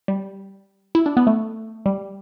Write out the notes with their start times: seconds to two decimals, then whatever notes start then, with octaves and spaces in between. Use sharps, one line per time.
0.08 G3
0.95 E4
1.06 D4
1.17 B3
1.27 A3
1.86 G3